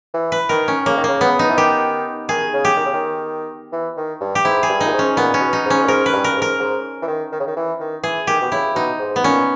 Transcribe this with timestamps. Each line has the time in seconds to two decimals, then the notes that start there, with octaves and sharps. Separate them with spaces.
0.14 E3
0.32 B4
0.49 D#3 A#4
0.68 C#4
0.86 C#3 A#3
0.97 D#3
1.04 C#3 A#3
1.21 B3
1.39 D#4
1.49 E3
1.57 D#3 G4
2.29 D#3 G#4
2.53 C#3
2.65 G4
2.77 D#3
2.86 C#3
2.94 D#3
3.73 E3
3.97 D#3
4.21 G2
4.35 G4
4.45 G#2 E4
4.63 G#4
4.69 G2
4.80 D#4
4.86 A#2
4.93 G#2
4.99 C#4
5.16 A#2 B3
5.34 C#4
5.40 B2
5.53 D#4
5.65 G#2
5.70 C#4
5.83 A#2
5.88 G#2 A#4
6.06 B4
6.13 G2
6.24 A#4
6.37 G#2
6.42 A#4
6.60 G#2
7.02 E3
7.08 D#3
7.32 D#3
7.40 C#3
7.47 D#3
7.57 E3
7.80 D#3
8.03 E3 G#4
8.27 D#3 G4
8.42 B2
8.52 C#3 E4
8.75 B2 D#4
8.99 G#2
9.16 B3
9.24 A#2 C#4